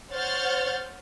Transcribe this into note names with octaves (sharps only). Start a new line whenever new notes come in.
C5 C#5 F#5 F6 G6 A6